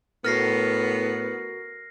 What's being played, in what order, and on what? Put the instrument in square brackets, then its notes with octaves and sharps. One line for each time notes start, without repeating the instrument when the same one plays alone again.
[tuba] A2 [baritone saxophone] B3 [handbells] F#4 A#4 [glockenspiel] F6 A#6 C7